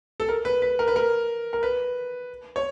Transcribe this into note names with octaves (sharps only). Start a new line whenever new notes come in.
A4
A#4
B4
B4
A#4
B4
A#4
A#4
B4
C#5